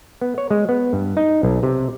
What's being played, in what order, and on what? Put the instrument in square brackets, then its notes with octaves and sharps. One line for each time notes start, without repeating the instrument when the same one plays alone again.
[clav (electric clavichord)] B3
C#5
G#3
B3
G2
D#4
B1
C3